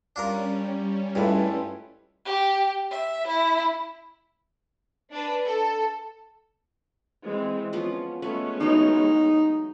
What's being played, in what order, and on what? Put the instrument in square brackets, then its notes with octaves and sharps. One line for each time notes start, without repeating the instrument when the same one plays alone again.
[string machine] G3 C#4 [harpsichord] D4 F4 A#4
[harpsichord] G2 [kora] G#3 A3 B4 [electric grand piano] E4 F4
[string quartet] G4
E5
E4
[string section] D4 B4
A4
[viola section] E3 G#3 C4
[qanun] F3 B3 F4 [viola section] C#4
[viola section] G#3 B3 C#4 [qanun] A3 B4
[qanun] E3 F#3 [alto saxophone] D#4